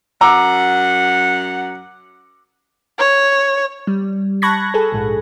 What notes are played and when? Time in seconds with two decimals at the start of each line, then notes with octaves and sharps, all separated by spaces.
0.21 F#2 F#5 A#5 D6 E6
2.99 C#5
3.87 G3
4.42 A5 B5 C#6 F#6 G#6 A#6
4.74 G#4 A4
4.92 A#1 G#2